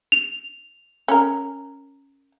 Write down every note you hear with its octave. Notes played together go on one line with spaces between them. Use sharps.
F7
C#4 A#4